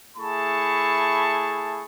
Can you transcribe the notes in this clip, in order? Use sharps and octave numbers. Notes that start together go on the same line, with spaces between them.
A3 E4 G#4 A5 B5 C#6